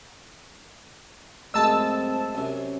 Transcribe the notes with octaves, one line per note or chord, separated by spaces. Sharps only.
A1 F#2 G#3 C4 A5 E6
F#2 C3 C#4